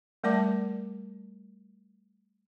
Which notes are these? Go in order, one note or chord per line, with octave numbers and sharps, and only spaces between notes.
G3 A3 A#4 D5 A5 D6